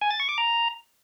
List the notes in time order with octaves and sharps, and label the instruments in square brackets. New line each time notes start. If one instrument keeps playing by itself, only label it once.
[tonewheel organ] G#5
A6
C#6
D6
A#5